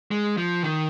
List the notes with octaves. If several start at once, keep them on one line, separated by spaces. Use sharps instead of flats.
G#3
F3
D#3